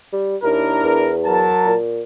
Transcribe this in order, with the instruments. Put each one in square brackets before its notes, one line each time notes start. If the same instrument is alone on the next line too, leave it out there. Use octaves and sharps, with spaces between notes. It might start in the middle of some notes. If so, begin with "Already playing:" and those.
[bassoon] G3
[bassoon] D#2 [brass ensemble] D4 E4 A#4
[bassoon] E2
[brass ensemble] F#3 A#4 A5
[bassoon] A#2